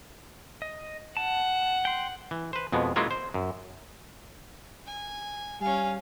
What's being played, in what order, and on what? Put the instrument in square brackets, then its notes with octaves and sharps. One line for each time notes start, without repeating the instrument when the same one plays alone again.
[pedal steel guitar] D#5
[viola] F#5 [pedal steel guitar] A5
[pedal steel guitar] G5 C6
[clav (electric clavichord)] E3
B4 C5
F2 B2 G#3 B3
F#3 G#3 A#3 C#4 E4 F4
C5
F#2
[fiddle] G#5
[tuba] G3 [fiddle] C#4 F5 [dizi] G#5